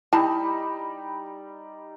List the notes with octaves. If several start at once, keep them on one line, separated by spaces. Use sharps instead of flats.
G3 D#4 E4 A5